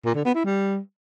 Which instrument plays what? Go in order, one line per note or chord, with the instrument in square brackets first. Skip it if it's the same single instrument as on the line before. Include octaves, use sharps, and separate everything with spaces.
[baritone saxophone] A#2
D3
B3
E4
G3